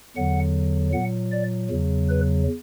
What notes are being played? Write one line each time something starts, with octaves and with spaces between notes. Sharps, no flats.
E2 D3 F#3 F#5
A#2 F#3 F#5
D5
E2 C#3 F#3
B4